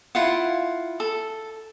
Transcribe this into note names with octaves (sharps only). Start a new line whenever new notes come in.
E4 F4 F#5
A4